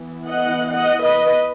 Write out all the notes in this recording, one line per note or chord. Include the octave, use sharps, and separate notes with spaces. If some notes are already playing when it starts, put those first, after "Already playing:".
Already playing: E3 B3
D#5 F#5
D#5 F#5
B4 D#5